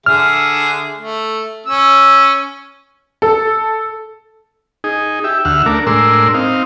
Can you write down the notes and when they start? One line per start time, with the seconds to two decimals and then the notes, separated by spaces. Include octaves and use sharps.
0.06 D3 G#4 E5 F6
0.98 A3
1.67 C#4 E6
3.22 A4
4.84 D#4 G#4
5.24 G4 E5
5.45 D2 E5 F#5 F6
5.66 A3 D4 A#4
5.87 A2 G#3 D4 A#4 C6 E6
6.34 C4 D#4 F5